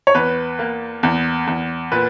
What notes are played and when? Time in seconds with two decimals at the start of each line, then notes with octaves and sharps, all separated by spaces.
0.07 C#5
0.15 E2 B4
0.59 A#3
1.03 E2
1.47 E2
1.92 A#2 B4